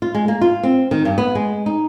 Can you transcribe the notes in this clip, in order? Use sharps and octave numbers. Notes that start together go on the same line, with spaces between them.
F4
G#3
A#3
F4
C4
D#3
G2
B3
G#3
D#4